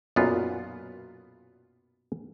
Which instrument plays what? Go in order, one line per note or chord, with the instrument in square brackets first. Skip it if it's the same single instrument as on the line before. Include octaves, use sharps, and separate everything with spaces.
[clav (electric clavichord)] B1 F#2 A#2 B3 F4